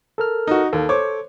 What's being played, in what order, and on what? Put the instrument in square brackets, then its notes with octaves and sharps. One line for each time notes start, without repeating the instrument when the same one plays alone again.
[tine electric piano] A4 A#4 F6
[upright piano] D#4 F#4
[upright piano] D#2 [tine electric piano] A4
[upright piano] C5 C#5 D6